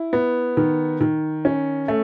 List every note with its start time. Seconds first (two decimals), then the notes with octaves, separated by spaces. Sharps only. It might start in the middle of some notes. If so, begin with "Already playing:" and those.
Already playing: E4
0.13 B3
0.57 D#3
1.01 D#3
1.45 C#4
1.88 A3